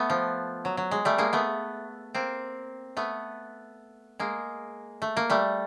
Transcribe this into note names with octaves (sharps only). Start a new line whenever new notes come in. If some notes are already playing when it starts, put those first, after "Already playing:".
Already playing: A3 B3
F3
F#3
F#3
G#3
G3 A3
G#3 A#3
A3 B3
A#3 C4
A3 B3
G#3 A#3
A3
A#3
G3 A3